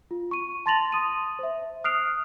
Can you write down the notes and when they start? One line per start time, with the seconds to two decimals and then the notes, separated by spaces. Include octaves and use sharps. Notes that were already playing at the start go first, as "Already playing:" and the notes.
0.11 F4
0.31 C#6 D#7
0.66 A5 C6 A6 A#6 F7 F#7
0.92 C6 D#6 D#7
1.39 C5 E5
1.84 D#6 F6 F#6 C7 D7 F7